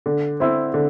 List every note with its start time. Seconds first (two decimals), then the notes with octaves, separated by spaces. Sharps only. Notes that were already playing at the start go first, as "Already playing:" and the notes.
0.06 D3
0.40 C4 E4
0.74 D3